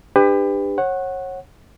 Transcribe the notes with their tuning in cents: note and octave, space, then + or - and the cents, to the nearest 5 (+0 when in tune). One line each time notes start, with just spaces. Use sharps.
D4 +25 G4 +30 B4 +25
C#5 -30 F#5 +0